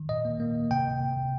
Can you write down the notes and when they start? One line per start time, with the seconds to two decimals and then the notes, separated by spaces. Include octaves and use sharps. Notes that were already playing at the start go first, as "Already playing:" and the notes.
Already playing: D#3
0.09 A#2 D#5
0.25 A#3
0.40 A#3
0.55 A#3
0.71 C3 G5